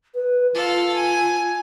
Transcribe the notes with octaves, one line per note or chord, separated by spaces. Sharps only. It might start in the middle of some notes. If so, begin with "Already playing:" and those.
B4
F4 A4 F5
G#5